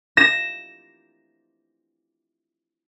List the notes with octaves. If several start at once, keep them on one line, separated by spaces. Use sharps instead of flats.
A#6 E7